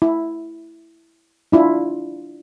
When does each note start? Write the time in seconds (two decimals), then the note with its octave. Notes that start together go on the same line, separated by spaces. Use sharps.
0.02 E4
1.52 D4 E4 F4